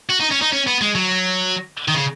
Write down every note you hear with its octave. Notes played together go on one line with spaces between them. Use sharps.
F#4
D#4
C#4
D#4
C#4
B3
G#3
F#3
D#3
C#3